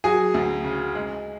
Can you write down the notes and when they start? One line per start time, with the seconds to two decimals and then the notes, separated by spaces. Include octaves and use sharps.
0.04 F#3 G#4 G#5
0.34 D2
0.64 C#3
0.95 G#3